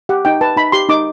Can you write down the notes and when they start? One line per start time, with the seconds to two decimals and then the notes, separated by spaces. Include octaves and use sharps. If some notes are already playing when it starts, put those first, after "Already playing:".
0.09 G4 F#5
0.25 D#4 G5
0.41 B4 A5
0.57 D#4 B5
0.72 G4 C6
0.89 D#4 D6